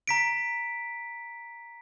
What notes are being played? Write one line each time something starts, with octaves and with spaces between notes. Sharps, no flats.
A#5 B6 D7